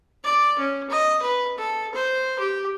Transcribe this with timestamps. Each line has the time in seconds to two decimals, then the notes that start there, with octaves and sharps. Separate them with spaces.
0.24 D5
0.59 C#4
0.90 D#5
1.22 B4
1.58 A4
1.95 C5
2.39 G4